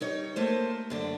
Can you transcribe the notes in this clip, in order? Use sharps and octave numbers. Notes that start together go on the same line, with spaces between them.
G3 D#4 C#5
A3 A#3 C5
F#2 D3 D4